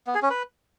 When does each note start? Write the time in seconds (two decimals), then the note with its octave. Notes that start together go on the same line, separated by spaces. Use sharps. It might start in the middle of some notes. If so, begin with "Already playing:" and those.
0.07 B3
0.15 G#4
0.22 C#4
0.30 B4